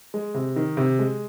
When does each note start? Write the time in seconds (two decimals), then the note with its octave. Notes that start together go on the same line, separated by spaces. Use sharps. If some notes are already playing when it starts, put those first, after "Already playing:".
0.14 G#3
0.34 C3
0.56 D#3
0.77 C3
0.99 G#3